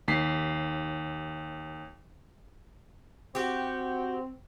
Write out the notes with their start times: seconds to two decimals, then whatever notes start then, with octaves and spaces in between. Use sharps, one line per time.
0.08 D#2 B6 C7
3.35 C4 F#4 G4